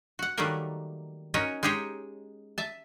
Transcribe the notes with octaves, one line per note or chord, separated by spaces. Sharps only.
F#4 F#5
D#3 F#3 G3 A3 A#3 A#4
C#4 D#4 F#4 A#4 C#5 D#5
G#3 D#4 G4 G#4 C#5
E5 A5